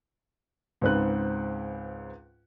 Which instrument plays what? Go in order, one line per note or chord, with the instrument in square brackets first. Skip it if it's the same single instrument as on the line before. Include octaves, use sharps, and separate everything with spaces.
[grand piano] C#2 G#2 C4 B4 F#6